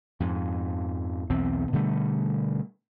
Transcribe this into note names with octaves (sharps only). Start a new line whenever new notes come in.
F2 G#2
B1 E2 C4
B2 D3 G3 A3